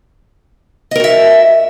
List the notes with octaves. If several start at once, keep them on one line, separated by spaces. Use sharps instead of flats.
F#4 A#4 D#5 E5